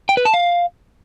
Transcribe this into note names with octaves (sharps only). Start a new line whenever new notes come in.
G5
B4
A5
F5